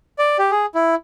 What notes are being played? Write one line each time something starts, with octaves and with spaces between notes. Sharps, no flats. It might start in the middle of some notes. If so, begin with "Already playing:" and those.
D5
G4
G#4
E4